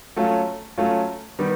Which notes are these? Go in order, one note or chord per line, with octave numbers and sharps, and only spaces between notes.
F#3 A3 C#4 F4
F#3 A3 C#4 F4
D#3 G3 B3